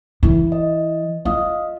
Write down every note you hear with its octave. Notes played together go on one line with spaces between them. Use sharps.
E3
D#5
F4 D#5 F5 D#6